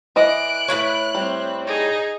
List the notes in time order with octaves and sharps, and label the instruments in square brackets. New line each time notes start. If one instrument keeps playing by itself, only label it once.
[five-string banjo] E3 D5 D#5 [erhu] F#6 [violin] D7
[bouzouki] A2 B4 C#5
[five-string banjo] G3 [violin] C4
[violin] D#4 A#6 [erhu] G#4